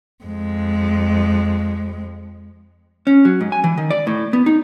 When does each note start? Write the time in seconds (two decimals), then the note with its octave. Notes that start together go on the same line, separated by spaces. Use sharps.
0.24 F2 G#3
3.07 C#4
3.25 F#3
3.41 G#2
3.52 G#5
3.64 E3
3.78 D#3
3.90 D5
4.07 A2
4.33 B3
4.46 D#4